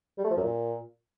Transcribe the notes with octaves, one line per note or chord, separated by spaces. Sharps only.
G3
A3
F3
F#2
A#2